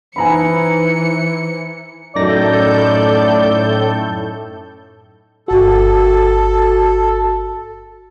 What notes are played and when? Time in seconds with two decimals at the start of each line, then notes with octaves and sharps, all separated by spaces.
0.16 E3 D#4 C5 G#5 A#5 B5 C#7
2.16 F#2 A2 D#4 A4 D5 G6 A#6
5.48 G1 F#4 A4